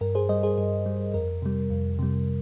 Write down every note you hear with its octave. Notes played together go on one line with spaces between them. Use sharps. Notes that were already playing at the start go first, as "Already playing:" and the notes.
G2 A#4
G#4 C5
G3 C5 D#5
G#4 C5
G2 G#4
G3
F2 A#4
C3 G3
F2
C3 G3